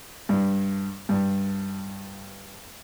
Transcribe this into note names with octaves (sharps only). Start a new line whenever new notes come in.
G2
G2